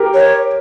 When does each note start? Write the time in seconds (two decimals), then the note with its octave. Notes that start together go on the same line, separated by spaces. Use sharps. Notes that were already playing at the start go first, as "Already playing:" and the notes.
Already playing: G4 A#4
0.14 C#5